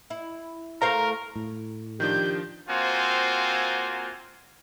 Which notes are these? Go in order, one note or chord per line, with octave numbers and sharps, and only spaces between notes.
E4
A3 A#4 C5 F5 A#5
A2
D#3 F3 D4 G4 G6
A#3 C4 F4 F#4 C5 G#5